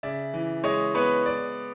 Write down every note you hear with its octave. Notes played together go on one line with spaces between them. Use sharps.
C#3 D5 E5
E3
G#3 C#5 D#5
B3 B4 C#5
D5